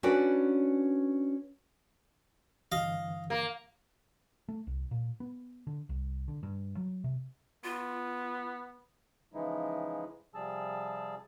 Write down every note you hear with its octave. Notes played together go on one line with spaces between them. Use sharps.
C#4 D4 F#4 B4 D5
G2 D3 E3 D#5 F5
A#3
A3
C2
A#2
B3
D3
C2
D3
G2
F#3
C3
B3 F4
C#3 E3 F3 G#3 D#4 E4
C3 F3 G3 G#4 A5 E6